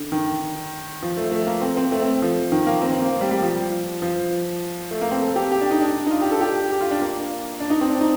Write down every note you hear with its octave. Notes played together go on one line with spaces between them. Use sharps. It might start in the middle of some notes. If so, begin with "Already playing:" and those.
Already playing: D3
D#3
F3
A3
A3
A#3
C4
C4
A3
C4
F3
D#3
A#3
C4
C4
A#3
G3
G3
F3
F3
A3
A#3
C4
A4
G4
G4
D4
D#4
D4
D#4
F4
G4
A4
G4
G4
F4
D4
A#3
D4
D#4
C4
D4
D#4